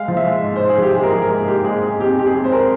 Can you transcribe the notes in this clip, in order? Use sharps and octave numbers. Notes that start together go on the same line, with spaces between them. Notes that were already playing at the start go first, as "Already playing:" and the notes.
Already playing: G#3 F5
F3
E5
G#3
G#2
G#2 C5
G#4
F3 G4
G#3 G4
A#4
F3 G#4
A#4
G#2
G#3 G4
G#3 G#4
G#2 G#4
F2 G4
F2 G4
G#4
F2
C5
A#4